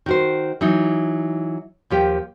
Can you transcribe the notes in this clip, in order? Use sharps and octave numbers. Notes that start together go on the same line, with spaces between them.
D#3 F#4 C5
E3 F#3 D#4
D#2 F3 G4 G5